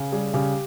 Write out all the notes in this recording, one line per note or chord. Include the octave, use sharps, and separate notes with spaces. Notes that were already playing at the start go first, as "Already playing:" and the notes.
Already playing: C#3
G3 G#4
C#3 G4